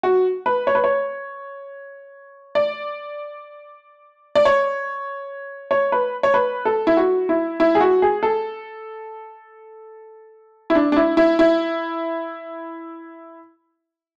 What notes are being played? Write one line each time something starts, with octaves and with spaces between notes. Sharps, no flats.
F#4
B4
C#5
B4
C#5
D5
D5
C#5
C#5
B4
C#5
B4
A4
E4
F#4
E4
E4
G#4
F#4
G#4
A4
E4
D4
D4
E4
E4
E4